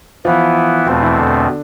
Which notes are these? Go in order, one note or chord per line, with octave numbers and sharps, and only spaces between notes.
E3 F3 B3 E4 F4
E2 B2 F3 A3 C4 F4
E3 E4
D3 D4